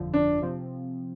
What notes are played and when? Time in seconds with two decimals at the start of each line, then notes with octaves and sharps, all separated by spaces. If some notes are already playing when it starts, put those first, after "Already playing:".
Already playing: G1 F2 D3 F3
0.14 D4
0.42 C3 F3 C4